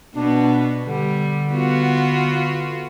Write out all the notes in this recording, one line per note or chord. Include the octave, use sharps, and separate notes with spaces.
B2 B3 D4
D3 G3
B3 F4 F#4